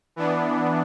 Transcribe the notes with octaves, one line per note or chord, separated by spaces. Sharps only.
E3 B3 D4